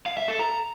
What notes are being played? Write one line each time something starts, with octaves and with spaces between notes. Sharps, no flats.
F5
E5
A4
A#5